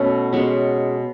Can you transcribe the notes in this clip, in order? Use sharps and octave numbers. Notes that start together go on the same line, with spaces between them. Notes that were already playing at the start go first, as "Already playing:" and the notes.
Already playing: B2 A3 C#4
B2 G#3 B3 C#4